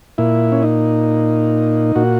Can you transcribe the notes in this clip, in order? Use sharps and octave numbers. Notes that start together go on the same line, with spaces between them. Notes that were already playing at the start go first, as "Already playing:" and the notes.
A#2 E4
C#4
D#4
A#2 F#4